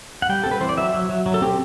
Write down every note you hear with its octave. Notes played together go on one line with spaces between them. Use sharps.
F#5
G3 G5
C4 A4
B4
E3 C5
D5
F#3 E5
F#3
F#3
F#3
A4
C4 G4